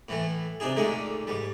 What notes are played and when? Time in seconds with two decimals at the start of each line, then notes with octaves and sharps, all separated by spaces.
0.09 A2 E3 A3
0.60 C3 D4 D#4 G#4
0.77 A#2 D3 D#3 G#3 A3 D#4
1.27 G#2 G3